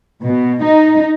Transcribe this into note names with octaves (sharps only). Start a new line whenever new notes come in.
B2
D#4